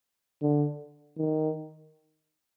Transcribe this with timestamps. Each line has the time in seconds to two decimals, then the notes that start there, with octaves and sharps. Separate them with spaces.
0.42 D3
1.18 D#3